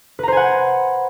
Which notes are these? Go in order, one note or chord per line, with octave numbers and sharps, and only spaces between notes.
B4 C5 F#5 G#5 A#5